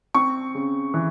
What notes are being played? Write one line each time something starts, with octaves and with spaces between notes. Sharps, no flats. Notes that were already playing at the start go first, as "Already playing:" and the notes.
C4 C#6
C#3
E3